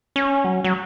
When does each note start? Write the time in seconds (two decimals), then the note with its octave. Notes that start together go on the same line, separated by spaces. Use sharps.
0.16 C#4
0.44 F#3
0.64 F#3